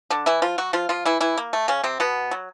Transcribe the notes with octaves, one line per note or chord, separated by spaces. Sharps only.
D3 D4
E3 E4
F3 F4
F#3 F#4
F3 F4
F3 F4
E3 E4
E3 E4
A#3
A3
C#3 C#4
C3 C4
B2 B3
F#3